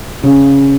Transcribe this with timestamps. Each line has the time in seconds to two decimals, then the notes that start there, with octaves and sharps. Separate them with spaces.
0.23 C#3